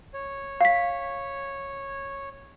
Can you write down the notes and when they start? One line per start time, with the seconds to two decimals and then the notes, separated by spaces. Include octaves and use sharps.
0.14 C#5
0.61 F5 B6